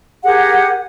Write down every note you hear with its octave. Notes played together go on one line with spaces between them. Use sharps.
G4 G#4 A#4 F#5